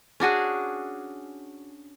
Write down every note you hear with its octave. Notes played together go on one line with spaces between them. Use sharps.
C#4 D4 F#4 G#4